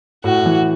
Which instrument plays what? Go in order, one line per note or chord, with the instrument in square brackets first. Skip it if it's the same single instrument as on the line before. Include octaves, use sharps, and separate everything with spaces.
[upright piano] A2 [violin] F#4
[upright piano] E3